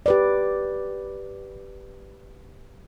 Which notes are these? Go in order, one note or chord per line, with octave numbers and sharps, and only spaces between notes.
G4 B4 D5